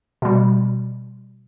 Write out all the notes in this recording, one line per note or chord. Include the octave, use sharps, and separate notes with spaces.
B2 G3